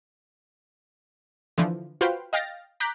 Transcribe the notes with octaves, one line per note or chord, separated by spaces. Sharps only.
D3 E3 F3
F4 F#4 B4 C5 F5 G5
D#5 F5 G5 F6 A6 A#6
A#5 D6 F#6 G6 B6